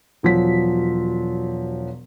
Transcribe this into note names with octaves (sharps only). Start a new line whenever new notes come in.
E1 F3 F#3 B6